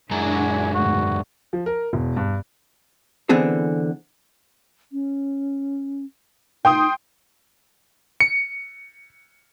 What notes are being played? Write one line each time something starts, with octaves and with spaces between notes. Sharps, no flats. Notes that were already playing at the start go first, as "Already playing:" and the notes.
F#2 G#3 D4 E4 F#4 G#5 A#5
D2 G#2 F#4
F3
A#4
E1
G2
D3 E3 B3 C4 G#4 A4
C#4
D#4 G5 C6 D#6
C#7